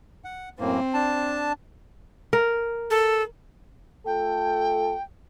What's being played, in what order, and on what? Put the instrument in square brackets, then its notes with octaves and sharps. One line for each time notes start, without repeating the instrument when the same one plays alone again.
[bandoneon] F#5
[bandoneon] F#2 A2 A#3 [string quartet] C4
[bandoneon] D4 A5
[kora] A#4
[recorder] A4
[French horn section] A3 F4 A4 [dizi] G5